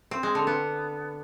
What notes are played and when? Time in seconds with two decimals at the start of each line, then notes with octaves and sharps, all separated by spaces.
0.11 C4
0.23 G#3
0.35 D3
0.47 B3